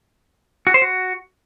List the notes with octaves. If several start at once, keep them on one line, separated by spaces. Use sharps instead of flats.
F#4
C5
F#4